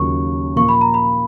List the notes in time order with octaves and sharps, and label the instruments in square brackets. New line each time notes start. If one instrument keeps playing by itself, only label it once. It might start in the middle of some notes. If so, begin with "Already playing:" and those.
Already playing: [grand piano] D#2 C#3 F#3 C#4 F4 [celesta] C#6
[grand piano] A#2 F3 A#3 F4 [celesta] C#6
[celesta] B5
A#5
B5